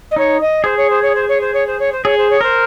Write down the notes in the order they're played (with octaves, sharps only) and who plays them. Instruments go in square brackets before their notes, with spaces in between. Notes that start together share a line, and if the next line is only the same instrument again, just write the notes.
[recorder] D#5
[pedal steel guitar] D#4 [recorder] C#5
[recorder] D#5
[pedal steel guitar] G#4 [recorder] C5
[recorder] C#5
C5
C#5
C5
C#5
C5
C#5
C5
C#5
C5
[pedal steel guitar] G#4 [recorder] C#5
[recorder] C5
C#5
[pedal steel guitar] A#4 [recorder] C5